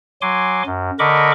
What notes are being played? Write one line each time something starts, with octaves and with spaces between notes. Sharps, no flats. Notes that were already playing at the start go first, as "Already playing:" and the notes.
F#3 G#5 C6 D6
F#2
D3 A#4 D#5 B5 C#6 D6